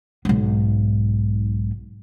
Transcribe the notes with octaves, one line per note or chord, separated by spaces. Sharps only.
B1 G#2